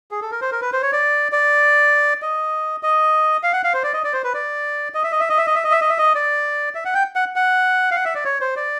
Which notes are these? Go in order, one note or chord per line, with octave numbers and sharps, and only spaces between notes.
G#4
A4
A#4
C5
A#4
B4
C5
C#5
D5
D5
D#5
D#5
F5
F#5
F5
C5
D5
D#5
D5
C5
B4
D5
D#5
E5
D#5
E5
D#5
E5
D#5
E5
D#5
E5
D#5
E5
D#5
D5
E5
F#5
G5
F#5
F#5
F5
F#5
E5
D5
C#5
C5
D5